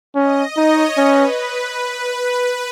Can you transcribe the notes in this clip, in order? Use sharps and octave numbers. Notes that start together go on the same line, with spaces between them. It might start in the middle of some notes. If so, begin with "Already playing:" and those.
C#4 D#5
D#4 C#5
C#4 B4